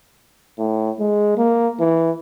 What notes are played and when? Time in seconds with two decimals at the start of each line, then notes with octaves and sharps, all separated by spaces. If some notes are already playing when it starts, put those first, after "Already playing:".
0.58 A2
1.00 G#3
1.37 A#3
1.79 E3